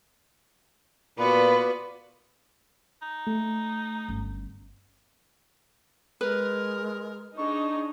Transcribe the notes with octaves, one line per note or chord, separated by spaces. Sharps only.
A#2 B3 F4 F#4 B4 D5 B5
D#4
A3
G1 C#4
G#3 A#4 B4
D4 D#4 G#4 D#5 C#6